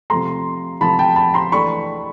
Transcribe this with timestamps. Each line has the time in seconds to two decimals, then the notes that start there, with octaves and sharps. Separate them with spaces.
0.10 C3 F3 A3 A#5 C6
0.81 C3 F3 A3 A5 B5
0.99 G5 A5
1.16 A5 B5
1.34 A#5 C6
1.52 E3 A3 D4 B5 C#6